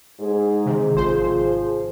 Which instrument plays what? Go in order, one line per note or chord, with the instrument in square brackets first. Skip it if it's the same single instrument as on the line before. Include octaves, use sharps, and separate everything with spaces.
[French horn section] G#2 G#4
[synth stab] C3 D#3
[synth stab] G#1 C5 [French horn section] F3 G#4